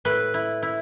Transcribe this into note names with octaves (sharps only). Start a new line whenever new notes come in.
A2 B4
E4
E4